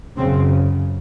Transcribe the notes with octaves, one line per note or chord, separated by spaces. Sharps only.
F#2 C#3 C4